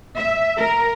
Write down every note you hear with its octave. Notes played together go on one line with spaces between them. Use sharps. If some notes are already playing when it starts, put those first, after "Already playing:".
E5
A#4